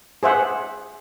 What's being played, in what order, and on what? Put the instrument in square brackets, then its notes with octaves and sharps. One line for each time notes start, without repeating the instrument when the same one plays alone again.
[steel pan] G#4 C5 E5 F#5